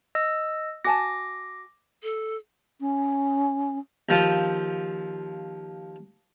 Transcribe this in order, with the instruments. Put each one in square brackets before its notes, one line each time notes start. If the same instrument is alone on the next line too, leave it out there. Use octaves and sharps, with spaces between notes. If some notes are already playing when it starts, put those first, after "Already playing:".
[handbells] D#5 E6
[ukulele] F#4 G#5 A5 [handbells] D6 A#6
[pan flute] A4
[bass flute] C#4
[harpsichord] D#2 F3 F4